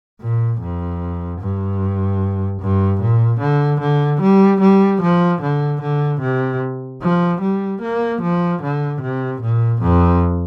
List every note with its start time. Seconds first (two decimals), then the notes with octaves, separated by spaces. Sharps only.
0.20 A#2
0.61 F2
1.40 G2
2.61 G2
3.01 A#2
3.40 D3
3.80 D3
4.21 G3
4.60 G3
5.01 F3
5.41 D3
5.81 D3
6.21 C3
7.02 F3
7.41 G3
7.82 A#3
8.21 F3
8.62 D3
9.01 C3
9.41 A#2
9.82 F2